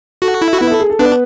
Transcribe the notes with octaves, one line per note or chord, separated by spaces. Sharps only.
F#4 A4
E4
F#4
B3 E4 B4
A4
G#4
A4
B3 D4 B4